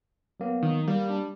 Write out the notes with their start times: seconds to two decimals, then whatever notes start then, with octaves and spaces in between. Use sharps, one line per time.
0.40 F#3 A#3 B3
0.63 D#3
0.87 G3 A#3
1.10 D4